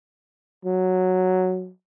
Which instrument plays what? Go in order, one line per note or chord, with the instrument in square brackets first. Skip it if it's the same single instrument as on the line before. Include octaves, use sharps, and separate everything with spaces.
[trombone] F#3